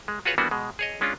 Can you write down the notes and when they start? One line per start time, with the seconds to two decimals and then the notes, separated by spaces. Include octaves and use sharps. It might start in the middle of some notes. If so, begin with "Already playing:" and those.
0.08 G#3
0.25 F4 F#4 G#4 B4 C#5 F#5
0.38 E3 G3 A#3 B3 D4 F#4
0.51 B2 G#3
0.79 G#4 C#5 D#5
1.01 G#3 C#4 D4 F4